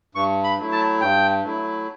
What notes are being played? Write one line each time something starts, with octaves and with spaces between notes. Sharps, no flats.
G2 C#6
B5
F#3 A3 E4
A5
G2 G5
F#3 A3 E4